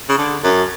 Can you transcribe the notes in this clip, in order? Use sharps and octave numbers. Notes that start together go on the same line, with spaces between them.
C#3
D3
F#2